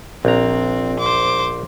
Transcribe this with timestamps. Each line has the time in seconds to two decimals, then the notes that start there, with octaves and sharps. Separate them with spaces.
0.25 A#1 C4 A#5
0.99 C5 D6